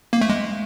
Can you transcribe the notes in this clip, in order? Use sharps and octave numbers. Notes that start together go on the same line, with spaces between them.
A#3
A3
G#3